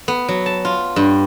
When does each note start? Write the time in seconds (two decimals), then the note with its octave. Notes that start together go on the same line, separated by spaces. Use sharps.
0.08 B3
0.28 F#3
0.46 A5
0.65 F4
0.96 G2